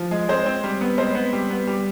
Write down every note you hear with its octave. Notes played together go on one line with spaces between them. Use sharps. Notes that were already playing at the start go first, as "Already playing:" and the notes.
Already playing: F3
G#3
G#3 C4 C5
C4
G3
B3
G#3 C4 C5
B3
G3
B3
G3